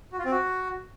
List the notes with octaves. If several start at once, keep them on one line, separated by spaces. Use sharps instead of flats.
F#4
F4
C4
F#4